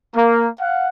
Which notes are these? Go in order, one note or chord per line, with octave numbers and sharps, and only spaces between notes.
A#3
F5 F#5